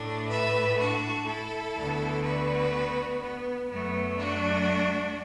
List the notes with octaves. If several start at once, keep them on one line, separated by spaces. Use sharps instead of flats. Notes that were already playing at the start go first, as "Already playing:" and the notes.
Already playing: A2 A3 D4
B4 E5
D4 F#4
E4 A4
D2 D3 B3
F#4 B4
B3
F#2 F#3 A3 B3
D4 F#4